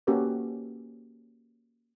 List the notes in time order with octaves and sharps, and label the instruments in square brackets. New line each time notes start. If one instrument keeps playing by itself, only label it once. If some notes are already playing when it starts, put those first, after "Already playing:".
[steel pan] A#3 C#4 F#4 G4 A4 B4